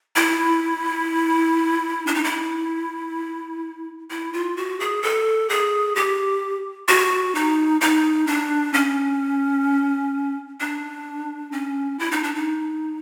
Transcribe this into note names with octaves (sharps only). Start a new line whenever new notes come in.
E4
D4
D#4
E4
E4
F4
F#4
G#4
A4
G#4
G4
F#4
D#4
D#4
D4
C#4
D4
C#4
E4
D#4
D4
D#4